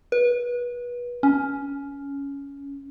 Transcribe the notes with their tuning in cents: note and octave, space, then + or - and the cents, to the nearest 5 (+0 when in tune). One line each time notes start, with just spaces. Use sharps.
B4 -25
C#4 +15